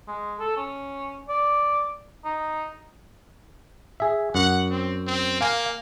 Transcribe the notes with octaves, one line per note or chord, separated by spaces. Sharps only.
G#3
A4
C#4
D5
D#4
G#4 E5
F#2 F#5
C4
C4
A#3 F5 G#5